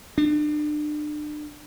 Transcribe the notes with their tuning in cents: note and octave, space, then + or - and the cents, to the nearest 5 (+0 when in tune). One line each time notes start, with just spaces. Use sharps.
D4 +35